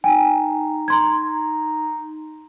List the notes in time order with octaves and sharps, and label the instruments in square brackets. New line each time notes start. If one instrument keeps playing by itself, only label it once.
[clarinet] D#4 [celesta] G5 G#5
[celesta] A#5 C6 G#6